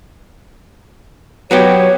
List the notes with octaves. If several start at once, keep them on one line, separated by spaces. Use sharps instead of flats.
F#3 B3 G4 C#5